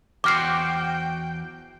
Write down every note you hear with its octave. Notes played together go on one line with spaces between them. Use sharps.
E2 F#4 C5 G5 D6 F6 C7